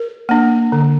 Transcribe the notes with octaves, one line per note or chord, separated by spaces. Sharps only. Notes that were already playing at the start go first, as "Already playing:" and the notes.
Already playing: A#4
A#3 D4
D3